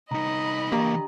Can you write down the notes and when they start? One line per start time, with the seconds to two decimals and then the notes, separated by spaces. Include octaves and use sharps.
0.11 C2 D#4 D#5 A#5 B5
0.72 E3 A#3 D4 G4 A#4 A#5